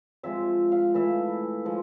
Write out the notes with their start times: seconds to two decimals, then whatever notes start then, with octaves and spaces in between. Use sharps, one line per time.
0.23 C3 F3 G#3 E5
0.72 F5
0.94 E3 A3 E4 E5
1.66 F3 G#3